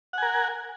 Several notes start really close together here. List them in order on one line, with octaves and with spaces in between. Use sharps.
F#5 G#5 A#4